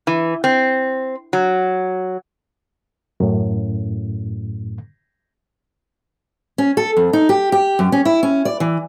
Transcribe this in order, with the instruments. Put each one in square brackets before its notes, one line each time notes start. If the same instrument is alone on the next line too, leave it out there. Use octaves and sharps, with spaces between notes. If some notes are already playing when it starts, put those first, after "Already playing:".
[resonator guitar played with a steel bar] E3
C4
F#3
[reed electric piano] F#2 A2
[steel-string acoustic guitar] C#4
A4
F2
D#4
G4
G4
F#2
C#4
E4
C#4
D5
E3